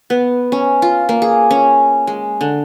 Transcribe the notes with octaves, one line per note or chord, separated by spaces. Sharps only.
B3
C#4
F4
A#3
G#4
C#4
G#3
D3